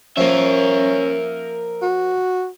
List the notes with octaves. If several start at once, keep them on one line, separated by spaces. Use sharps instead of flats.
F3 A#3 C#4 A#4 E5
F#4